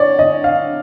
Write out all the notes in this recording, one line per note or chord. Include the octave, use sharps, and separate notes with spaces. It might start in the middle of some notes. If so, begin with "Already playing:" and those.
Already playing: C#5 D5
D#5
F5